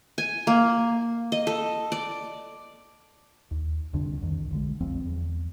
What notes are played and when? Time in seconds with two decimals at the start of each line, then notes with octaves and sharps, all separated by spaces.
0.18 G#5
0.47 A#3
1.32 D#5
1.47 A4
1.92 D5
3.51 D#2
3.93 C2 F2 D3 D4
4.22 F2 D#3
4.50 B1 D3 G#3
4.80 F#1 F2 F3 C4
5.05 E2